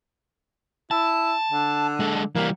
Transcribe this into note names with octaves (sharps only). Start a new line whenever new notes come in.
E4 A5
D3
G#3 A4
E3 G3 A#3